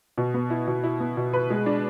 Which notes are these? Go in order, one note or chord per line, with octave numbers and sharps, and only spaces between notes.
B2
B3
E4
B2
E4
B3
B2
B4
G#3
D4